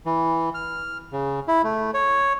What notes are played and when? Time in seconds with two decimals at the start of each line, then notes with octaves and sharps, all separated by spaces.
0.06 E3
0.54 F6
1.13 C#3
1.48 E4
1.64 A3
1.94 C#5